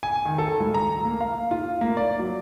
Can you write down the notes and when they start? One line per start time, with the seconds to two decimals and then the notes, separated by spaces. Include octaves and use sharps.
0.03 G#5
0.25 D#3
0.38 A4
0.60 C#2
0.74 A#5
1.05 A#3
1.21 F5
1.51 F4
1.81 A#3
1.97 D5
2.20 F#3